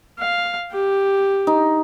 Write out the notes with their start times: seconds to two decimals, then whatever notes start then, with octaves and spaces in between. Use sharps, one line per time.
0.19 F5
0.72 G4
1.47 D#4